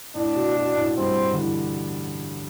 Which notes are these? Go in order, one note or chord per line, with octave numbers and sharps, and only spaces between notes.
A2 D4
B2
B2
A2
G2 C4
D3
E3